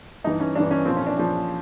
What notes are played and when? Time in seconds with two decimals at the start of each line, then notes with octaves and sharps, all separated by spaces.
0.24 G2 E3 D#4
0.40 C#4
0.56 G2 E3 D4
0.71 C#4
0.85 A#2 F3 C4
0.97 C#4
1.07 D4
1.17 A#2 F3